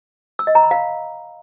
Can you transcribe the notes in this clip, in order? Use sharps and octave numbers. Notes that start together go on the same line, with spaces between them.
E6
D#5
A#5
B5
F5